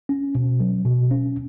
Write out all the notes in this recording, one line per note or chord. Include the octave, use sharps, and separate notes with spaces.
C#4
B2
F#3
B2
C#4